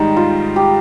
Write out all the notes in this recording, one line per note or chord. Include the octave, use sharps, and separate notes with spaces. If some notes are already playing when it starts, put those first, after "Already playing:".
Already playing: G#2 D#3 G3 D#4
F4
G4